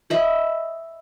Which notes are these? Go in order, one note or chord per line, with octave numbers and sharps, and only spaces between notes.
D#5 E5 B5